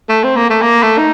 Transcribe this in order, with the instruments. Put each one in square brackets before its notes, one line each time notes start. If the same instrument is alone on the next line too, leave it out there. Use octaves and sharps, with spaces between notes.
[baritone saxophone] A3
C4
A#3
A3
A#3
A3
D#4